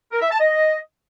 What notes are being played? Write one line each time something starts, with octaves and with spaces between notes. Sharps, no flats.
A#4
E5
A5
D#5